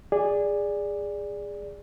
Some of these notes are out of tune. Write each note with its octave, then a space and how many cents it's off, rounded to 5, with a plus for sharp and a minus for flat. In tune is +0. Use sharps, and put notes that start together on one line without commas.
G#4 -15 D5 +0